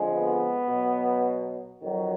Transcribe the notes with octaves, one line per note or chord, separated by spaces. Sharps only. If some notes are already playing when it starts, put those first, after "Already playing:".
Already playing: F2 D3 F3 G#3
B3
B2 F#3
F2 D#3 F#3